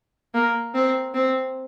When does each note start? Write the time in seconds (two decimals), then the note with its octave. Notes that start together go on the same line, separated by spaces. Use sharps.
0.34 A#3
0.75 C4
1.15 C4